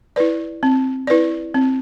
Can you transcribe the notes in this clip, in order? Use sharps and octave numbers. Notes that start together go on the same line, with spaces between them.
E4 B4 D5
C4
E4 B4 D5
C4